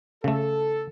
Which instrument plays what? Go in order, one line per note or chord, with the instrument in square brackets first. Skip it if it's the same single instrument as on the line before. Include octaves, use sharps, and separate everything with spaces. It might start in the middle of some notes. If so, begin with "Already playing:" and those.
[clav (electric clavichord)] C#3 A3 [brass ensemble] A4